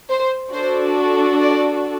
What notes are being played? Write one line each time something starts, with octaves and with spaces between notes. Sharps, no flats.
C5
D4 F#4 A4 C5
D5